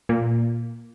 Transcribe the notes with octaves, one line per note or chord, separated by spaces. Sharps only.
A#2